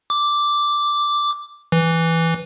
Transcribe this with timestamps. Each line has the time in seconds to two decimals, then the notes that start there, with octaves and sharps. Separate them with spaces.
0.10 D6
1.72 E3